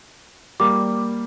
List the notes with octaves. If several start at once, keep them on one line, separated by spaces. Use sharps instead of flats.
G3 A#3 D6